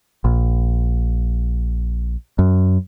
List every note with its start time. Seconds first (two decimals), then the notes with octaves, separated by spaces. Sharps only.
0.24 A#1
2.39 F#2